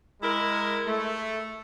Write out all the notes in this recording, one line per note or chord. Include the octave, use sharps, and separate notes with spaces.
G#3 E4 A#4
A3